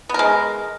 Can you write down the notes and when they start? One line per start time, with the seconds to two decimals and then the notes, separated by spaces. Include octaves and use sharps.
0.09 B3
0.14 A#4
0.19 G#3